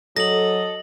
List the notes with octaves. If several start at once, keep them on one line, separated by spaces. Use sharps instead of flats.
F#3 A4 D#5 A#6 F#7